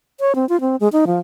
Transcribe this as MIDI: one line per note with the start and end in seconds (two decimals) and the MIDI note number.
0.20 0.35 73
0.35 0.48 60
0.49 0.60 65
0.61 0.76 60
0.80 0.88 56
0.93 1.05 63
1.07 1.19 53